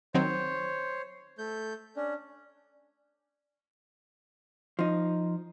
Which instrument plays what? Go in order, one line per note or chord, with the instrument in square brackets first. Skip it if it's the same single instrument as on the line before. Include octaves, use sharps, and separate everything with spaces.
[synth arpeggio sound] D#3 F#3 C4 [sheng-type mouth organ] C5 C#5
[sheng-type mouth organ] A3 G6
C#4 D4
[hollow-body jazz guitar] F3 D#4